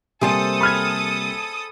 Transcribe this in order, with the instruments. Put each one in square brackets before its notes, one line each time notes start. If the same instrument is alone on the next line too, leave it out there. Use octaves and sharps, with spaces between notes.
[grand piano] C3 G3 A#3 [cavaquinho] G#4 C5 A5 [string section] A4 D#6
[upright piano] B5 F6 G#6